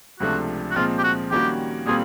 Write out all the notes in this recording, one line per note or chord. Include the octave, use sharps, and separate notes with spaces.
C#2 C3 F3 A3 D4 F#4
F#4
A#2 F3 G#3 C4 F4
G4
F#4
D#3 G3 A#3 C#4 F#4 G4
A#2 G3 C4 F4 G#4 A4